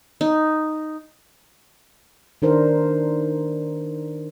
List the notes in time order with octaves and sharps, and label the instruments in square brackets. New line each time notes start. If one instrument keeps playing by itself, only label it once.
[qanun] D#4
[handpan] D#3 D4 A#4 C5